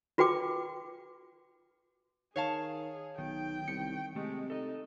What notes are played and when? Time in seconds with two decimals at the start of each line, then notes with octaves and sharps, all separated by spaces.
0.18 F4 F#4 B4 G5 D6
2.36 D#3 G#4 C#5 F5 A5
3.18 B1 D#3 G5
3.68 C2 C#7
4.16 C3 G#3 A3
4.50 D#4 A4 D#5